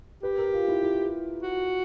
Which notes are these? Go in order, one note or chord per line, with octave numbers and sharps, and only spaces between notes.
G4 B4
A#4
F4
E4
E4
F#4